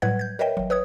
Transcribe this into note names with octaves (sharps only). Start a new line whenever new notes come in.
A2 F#3 G3 B4 F#5 G#6
G6 G#6
A#4 B4 C#5 D#5 E5 G5
G#1 F#3
B4 C#5 D#6 G#6